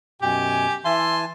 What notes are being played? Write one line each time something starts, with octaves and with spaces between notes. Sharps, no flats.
F#2 B2 G4 G5 G#5
E3 E5 G#5 A5 C6